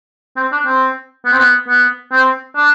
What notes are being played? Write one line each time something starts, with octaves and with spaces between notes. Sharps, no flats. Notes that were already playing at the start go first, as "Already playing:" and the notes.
C4
D4
C4
B3
C4
B3
B3
C4
D4